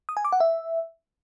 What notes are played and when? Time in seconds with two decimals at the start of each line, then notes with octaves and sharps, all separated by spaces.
0.09 D#6
0.17 G#5
0.25 D6
0.32 F#5
0.40 E5